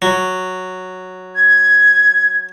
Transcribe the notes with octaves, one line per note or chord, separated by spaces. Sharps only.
F#3
G#6